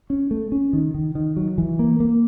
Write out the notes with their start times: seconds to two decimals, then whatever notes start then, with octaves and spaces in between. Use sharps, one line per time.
0.10 C#4
0.31 A3
0.52 C#4
0.73 D#3
0.94 D#3
1.15 D#3
1.37 F#3
1.58 E3
1.79 A#3
2.00 A#3